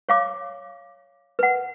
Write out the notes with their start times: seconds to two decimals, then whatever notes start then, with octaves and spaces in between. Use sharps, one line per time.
0.09 C#5 F5 D6
1.39 B4 F#5